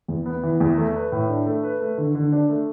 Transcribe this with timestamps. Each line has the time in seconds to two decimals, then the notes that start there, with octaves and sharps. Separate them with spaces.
0.08 E2
0.26 B3
0.43 E3
0.60 E2
0.78 A3
0.95 B4
1.12 A2
1.29 D4
1.46 A3
1.63 B4
1.80 A3
1.98 D3
2.15 D3
2.32 D4
2.49 A3